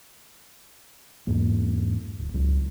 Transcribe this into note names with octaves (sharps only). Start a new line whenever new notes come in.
E2 G#2 A#3
D1
C#2 F#3